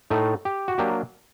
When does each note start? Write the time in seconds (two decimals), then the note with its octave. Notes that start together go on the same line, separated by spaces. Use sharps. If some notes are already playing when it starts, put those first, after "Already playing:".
0.10 A2 A3 D#4
0.45 G4
0.68 F#4
0.78 F#3 A#3 D4 G4